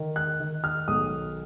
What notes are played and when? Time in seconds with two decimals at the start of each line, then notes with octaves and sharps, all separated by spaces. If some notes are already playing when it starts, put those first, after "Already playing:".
Already playing: D#3
0.16 F#6
0.40 D#3
0.64 F6
0.88 B1 D#6